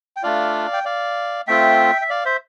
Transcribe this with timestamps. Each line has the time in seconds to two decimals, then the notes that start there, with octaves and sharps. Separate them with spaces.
0.17 G5
0.23 A3 D4 F4 D5 F5
0.73 G5
0.85 D5 F5
1.47 A3 C4 F4 E5 G5
2.01 E5
2.10 D5 F5
2.25 C5 E5